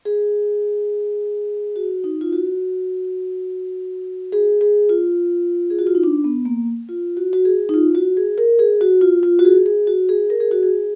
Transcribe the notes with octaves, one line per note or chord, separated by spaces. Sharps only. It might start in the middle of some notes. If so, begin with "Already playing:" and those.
G#4
F#4
D#4
F4
F#4
G#4
G#4
F4
G#4
F#4
F4
D#4
D4
B3
A#3
F4
F#4
F#4
G#4
D#4
F4
F#4
G#4
A#4
G#4
F#4
F4
F4
F#4
G#4
G#4
F#4
G#4
A#4
G#4
F#4
G#4